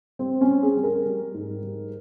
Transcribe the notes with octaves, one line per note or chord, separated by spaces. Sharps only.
G3 C4
C#4
G3
G#4
G3
A#4
G3
G#2
G3